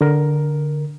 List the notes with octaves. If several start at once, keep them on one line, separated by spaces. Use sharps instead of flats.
D3 A#4